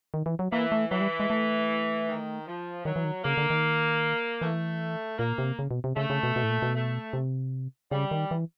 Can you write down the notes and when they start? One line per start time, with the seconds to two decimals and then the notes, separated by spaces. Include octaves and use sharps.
0.14 D#3
0.26 E3
0.39 F#3
0.52 E3 A#3
0.72 A3
0.91 E3 F#3
1.01 G3
1.20 G#3
1.30 A3
2.08 D#3
2.47 F3
2.85 D#3 F#3
2.96 E3
3.04 D#3
3.24 C#3 A#3
3.37 D3
3.50 D#3
4.41 E3 A3
5.19 A#2 A#3
5.38 C3
5.59 C#3
5.71 B2
5.84 C3
5.97 C#3 A3
6.10 C#3
6.23 B2
6.36 B2
6.43 A2
6.50 A#2
6.62 B2
6.75 A3
7.13 C3
7.91 C#3 G3
8.11 D#3
8.31 E3